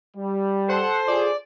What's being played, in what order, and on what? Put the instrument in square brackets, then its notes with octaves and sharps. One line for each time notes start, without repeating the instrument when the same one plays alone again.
[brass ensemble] G3
[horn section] A4 C5 [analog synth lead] F#5
[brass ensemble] F4 G#4 [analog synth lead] D5